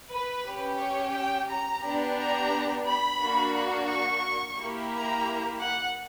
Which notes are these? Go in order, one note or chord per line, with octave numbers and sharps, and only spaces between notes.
B4
C#4 G4
C#5
G5
A#5
B3 D4 G4
A#5
B5
A#3 D4 F#4
C#6
A#3 E4 G4
A#5
F#5